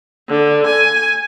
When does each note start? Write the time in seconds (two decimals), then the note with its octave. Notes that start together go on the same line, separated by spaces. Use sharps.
0.29 D3
0.66 G#5